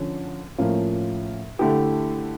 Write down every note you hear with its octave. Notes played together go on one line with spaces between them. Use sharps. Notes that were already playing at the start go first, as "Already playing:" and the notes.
Already playing: D3 F3 C#4
A2 F3 A#3 C#4 F4
D3 A3 E4 G4